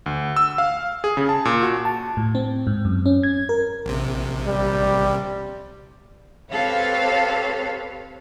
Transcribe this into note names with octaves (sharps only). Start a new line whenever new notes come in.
D2
E6
F5
G#4
C#3
A5
A#2
F#4
A5
A2
C4
G#2
F#2
C#4
G#6
A#4
A#1 C3
G3
C4 G4 A4 B4 C#5 F5